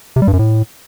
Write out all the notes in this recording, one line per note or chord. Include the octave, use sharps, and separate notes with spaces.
C3
G3
G2
F#2
A2